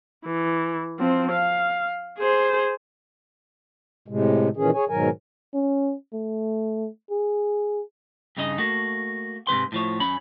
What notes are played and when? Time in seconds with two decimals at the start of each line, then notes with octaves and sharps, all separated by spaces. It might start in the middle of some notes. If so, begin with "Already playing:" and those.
0.25 E3
0.99 F3 C4
1.31 F5
2.18 G#4 C5
4.08 A2 C3 G#3
4.57 A#2 D#3 E3 C#4 G#4
4.74 G#4 C#5 G#5
4.89 G#2 B2 D#3 F#3 A#4 G#5
5.54 C#4
6.13 A3
7.11 G#4
8.37 G2 C#3 D#4 G4 D#5
8.58 A3 A#3 F#4
9.47 G#2 C3 D#3 B4 C6
9.72 A2 F3 C#5
10.00 F#2 C#4 B5